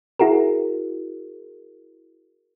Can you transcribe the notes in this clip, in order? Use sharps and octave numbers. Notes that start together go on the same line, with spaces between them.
E4 F#4 G#4 A#4